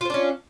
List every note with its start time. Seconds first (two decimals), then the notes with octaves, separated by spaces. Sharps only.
0.01 F4
0.05 C5
0.10 D4
0.14 C#4